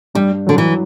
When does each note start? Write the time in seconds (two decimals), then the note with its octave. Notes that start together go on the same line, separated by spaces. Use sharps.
0.15 G2 G3
0.47 D3 F#3
0.58 E3